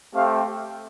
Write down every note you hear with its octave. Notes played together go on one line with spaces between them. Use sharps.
A3 C4 G4 F5